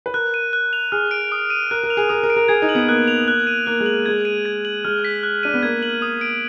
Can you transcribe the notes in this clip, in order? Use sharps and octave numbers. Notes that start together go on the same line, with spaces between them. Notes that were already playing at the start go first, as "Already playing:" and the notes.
B4
A#4 F#6
D#7
F#6
F7
G#4 F6
D7
D#6
D#7
A#4 F#6
A#4
F7
G#4
A#4 D#6
A#4
D7
A#4
G#4 G#6
D#4
F#7
B3
A#3 F#6
F7
F#6
D#7
A#3 F#6
G#3
F#7
G#3 G#6
D#7
G#6
F#7
G#3 F6
B6
F#6
D4 D#7
B3
A#3 G#6
F#7
D#6
D7